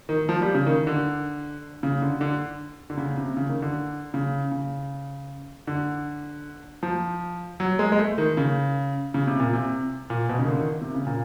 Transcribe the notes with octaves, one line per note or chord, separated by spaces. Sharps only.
D#3
F3
G3
C#3
D#3
D3
C#3
D3
D3
D3
C#3
C3
C#3
D#3
D3
C#3
C#3
D3
F3
F#3
G#3
G#3
A3
D#3
C#3
C#3
C3
A#2
C3
A#2
B2
C#3
D#3
D3
D#3
C3
C#3
A#2